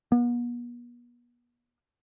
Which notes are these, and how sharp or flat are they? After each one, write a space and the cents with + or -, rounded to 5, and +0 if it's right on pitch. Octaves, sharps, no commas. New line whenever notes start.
B3 -40